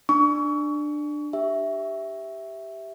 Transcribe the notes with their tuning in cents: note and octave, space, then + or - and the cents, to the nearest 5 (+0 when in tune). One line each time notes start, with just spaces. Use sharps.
D4 +15 C#6 +30
G4 +0 E5 +0